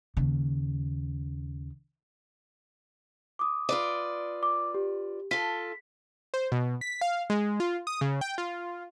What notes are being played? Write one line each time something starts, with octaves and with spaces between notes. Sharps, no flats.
D#2 C#3
D6 D#6
F4 B4 D5
D6
G4
F4 A4 B6
C5
B2
B6
F5
G#3
F4
D#6
C#3
G5
F4